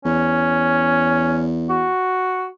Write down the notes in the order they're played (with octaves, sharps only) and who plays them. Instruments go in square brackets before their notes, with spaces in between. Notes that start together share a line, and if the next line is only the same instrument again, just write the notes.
[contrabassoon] E2 [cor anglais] C#4
[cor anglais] F#4